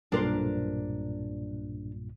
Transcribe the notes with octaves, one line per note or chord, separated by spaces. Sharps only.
B1 G2 A#2 D4 A#4 C5